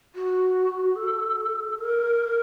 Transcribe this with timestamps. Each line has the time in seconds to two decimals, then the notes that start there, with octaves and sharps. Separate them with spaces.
0.15 F#4
0.96 A4
1.78 A#4